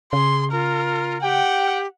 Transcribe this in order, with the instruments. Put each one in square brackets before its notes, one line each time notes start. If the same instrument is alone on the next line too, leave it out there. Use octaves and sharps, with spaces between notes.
[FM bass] C#3 [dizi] G#4 [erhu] C6
[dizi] F4 [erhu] A#4
[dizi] G4 [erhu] F#5 [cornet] G5